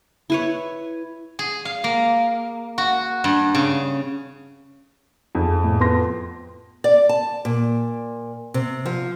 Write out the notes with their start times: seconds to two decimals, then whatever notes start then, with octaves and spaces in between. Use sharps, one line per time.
0.30 E4 B4 C#5
1.39 G#4
1.65 F5
1.84 A#3
2.78 F#4
3.24 G2
3.55 C#3
5.35 F2 G#4
5.64 A2
5.81 B3 C6 A#6
6.84 D5
7.09 A5
7.45 A#2
8.54 C3
8.86 F3